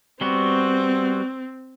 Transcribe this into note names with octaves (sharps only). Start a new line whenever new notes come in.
G3 B3 C4 F#4